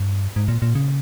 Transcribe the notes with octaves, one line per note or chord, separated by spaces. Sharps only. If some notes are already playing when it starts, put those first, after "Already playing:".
Already playing: G2
G#2
A#2
A#2
C#3